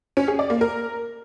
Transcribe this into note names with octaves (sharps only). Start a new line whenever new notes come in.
C#4
G#4
D5
A#3
A#4